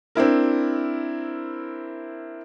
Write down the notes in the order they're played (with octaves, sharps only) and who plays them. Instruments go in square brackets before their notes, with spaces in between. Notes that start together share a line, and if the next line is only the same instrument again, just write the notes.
[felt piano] C4 D4 E4 A#4